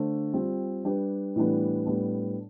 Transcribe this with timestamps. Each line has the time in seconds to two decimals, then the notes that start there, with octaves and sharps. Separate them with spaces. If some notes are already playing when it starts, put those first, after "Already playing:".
Already playing: D3 A3 D4 A4 C5
0.33 G3 C4 F4
0.84 G3 D4 G4 B4
1.36 A2 E3 G3 B3 D4
1.86 A2 G3 B3 D4